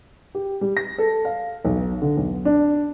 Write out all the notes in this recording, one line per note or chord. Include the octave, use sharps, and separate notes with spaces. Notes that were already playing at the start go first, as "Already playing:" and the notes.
G4
G3
A#6
A4
F5
B1
D3
B1
D4